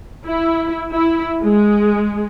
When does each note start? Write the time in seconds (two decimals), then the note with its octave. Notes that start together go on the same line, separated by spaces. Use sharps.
0.25 E4
0.92 E4
1.40 G#3